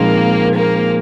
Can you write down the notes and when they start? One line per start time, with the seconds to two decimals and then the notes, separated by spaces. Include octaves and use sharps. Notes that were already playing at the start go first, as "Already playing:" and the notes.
Already playing: A#2 F3 G#3 A#3 C4 D#4
0.56 A#3